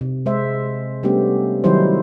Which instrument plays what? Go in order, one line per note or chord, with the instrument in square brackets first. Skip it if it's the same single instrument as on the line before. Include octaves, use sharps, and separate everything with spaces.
[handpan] C3
G#3 C5 E5
G3 A3 B3 C#4 D4 G4
D#3 F#3 G3 D#4 E4 C5